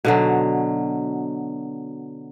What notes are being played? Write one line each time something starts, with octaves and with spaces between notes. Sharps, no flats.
B2 D3 F#3